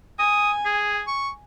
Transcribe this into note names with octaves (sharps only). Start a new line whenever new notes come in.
G#5 D#6
G#4
C#6